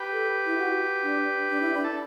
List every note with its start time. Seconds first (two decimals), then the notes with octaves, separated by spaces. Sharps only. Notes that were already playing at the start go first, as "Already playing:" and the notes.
Already playing: G4 B4
0.12 A4
0.46 E4
0.57 F#4
1.03 D4
1.49 D4
1.61 E4
1.73 D4
1.84 A4